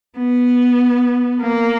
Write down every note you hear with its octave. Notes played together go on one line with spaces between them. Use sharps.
B3
A#3